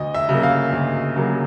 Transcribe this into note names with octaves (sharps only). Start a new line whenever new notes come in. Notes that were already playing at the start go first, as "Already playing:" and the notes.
Already playing: D2 D#5
E5
C#3 F#3 A#3
F5
D2
C#3 F#3 A#3